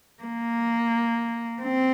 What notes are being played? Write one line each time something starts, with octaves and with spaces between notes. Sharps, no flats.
A#3
C4